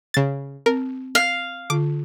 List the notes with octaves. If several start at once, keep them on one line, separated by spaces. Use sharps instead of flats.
C#3 A6
C4 A#4
F5
D3 F4 D6